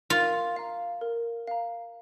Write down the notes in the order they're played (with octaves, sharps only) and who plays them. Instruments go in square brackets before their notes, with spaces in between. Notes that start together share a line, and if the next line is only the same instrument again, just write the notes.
[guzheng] F4 [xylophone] A#4
[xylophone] F5 A#5
A#4
F5 A#5